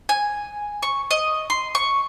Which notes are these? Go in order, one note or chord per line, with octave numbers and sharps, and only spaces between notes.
G#5
C#6
D#5
C6
C#6